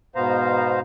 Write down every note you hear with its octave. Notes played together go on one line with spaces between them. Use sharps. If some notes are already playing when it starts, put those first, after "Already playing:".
G#2 B2 B3 C5 F5 A#5